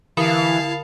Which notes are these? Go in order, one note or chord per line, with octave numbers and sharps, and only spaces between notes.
D3 E3 E4 A#4 F5 A5 B5